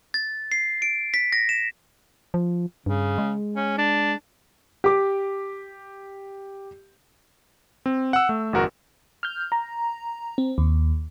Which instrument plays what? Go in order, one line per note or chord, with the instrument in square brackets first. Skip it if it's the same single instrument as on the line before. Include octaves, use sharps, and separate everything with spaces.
[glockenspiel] A6
C7
D7
B6
A#6
E7
[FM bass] F3
[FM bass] G2 [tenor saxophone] C#3
[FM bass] G#3
[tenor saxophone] C#4
D4
[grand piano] G4 D6
[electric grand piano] C4
F#5 E6
A3
G1 E2 F#4 A#4
[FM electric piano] F6 G6
A#5
C4
D#2